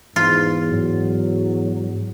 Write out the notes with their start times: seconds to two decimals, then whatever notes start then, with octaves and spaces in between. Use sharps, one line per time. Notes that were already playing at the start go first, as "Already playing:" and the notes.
0.16 E2 G#2 F4
0.71 G#2 F#3